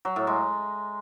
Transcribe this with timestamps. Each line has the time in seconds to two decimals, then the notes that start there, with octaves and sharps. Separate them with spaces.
0.05 F#3
0.16 A2
0.27 G#3